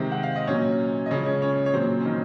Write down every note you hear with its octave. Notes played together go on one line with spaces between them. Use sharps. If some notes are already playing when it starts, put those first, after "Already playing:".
Already playing: C3 D#3 G#3 C4 C5
F#5
F5
D#5
A#2 F#3 C#4 C#5
D#5
C#3 F3 G#3 C#4 C#5
C#4 C#5
C#4 C#5
C#5
A#2 F#3 C4 C5
C#4
D#3 D#4